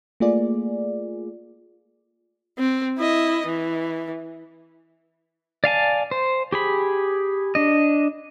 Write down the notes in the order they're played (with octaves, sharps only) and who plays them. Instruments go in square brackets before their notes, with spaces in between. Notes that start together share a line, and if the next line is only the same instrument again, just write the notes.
[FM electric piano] A3 A#3 F4 G#4 D5
[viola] C4
E4 D#5
E3
[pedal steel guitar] D5 F5 G#5 A5
C5
G4 G#4 B5
D4 D#5